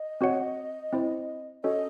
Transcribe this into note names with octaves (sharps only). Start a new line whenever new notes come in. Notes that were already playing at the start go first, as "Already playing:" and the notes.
Already playing: D#5
C4 F#4 C#5 F#5
C4 E4 C5
C#4 F#4 A4 C#5 D#5